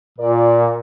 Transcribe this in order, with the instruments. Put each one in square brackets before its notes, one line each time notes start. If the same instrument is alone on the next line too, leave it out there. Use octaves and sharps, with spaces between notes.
[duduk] A#2 [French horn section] F4 A#4 D5